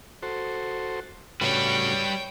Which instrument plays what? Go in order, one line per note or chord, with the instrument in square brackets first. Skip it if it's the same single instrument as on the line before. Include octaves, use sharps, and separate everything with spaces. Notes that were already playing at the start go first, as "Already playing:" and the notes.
[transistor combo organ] F#4 A4 C5
[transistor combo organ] A2 C#3 F#4 [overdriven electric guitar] G3 B4 [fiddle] C#5 G5